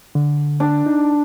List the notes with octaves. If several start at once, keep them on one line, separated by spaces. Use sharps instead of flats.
D3
D4
D#4